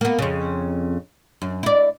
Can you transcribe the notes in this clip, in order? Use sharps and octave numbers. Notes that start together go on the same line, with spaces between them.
A#3 B3
F2 C#3
F#2
E4 D5